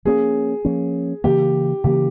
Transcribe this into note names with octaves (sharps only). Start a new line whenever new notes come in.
F3 A#3 C#4 G#4
F3 A#3 C#4
C#3 E3 A#3 G4
C#3 E3 A#3 G4